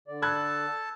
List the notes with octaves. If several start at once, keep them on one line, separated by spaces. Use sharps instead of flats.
D3 D5
A4 A5 B5 F#6 G#6